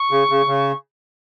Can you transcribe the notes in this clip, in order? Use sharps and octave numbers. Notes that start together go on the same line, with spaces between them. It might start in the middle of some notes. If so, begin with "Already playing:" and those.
Already playing: C#6
C#3
C#3
C#3